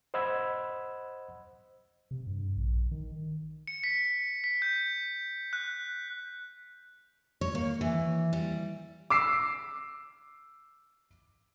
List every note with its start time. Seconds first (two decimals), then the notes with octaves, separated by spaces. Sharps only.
0.14 C5 D#5 F#5 B5 E6 G#6
2.11 C3
2.27 G2
2.56 A#1
2.91 D#3
3.67 C#7
3.84 B6
4.44 B6
4.62 G6
5.53 F#6
7.41 C#5
7.55 A#3
7.81 E3
8.33 G3
9.10 D6 E6 C7